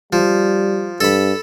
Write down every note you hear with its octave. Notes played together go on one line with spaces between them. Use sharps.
F3 G3
G2 A4 B5